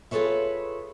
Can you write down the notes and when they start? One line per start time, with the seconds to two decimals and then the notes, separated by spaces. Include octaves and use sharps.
0.11 F4 G#4 A4 B4 C#5 E5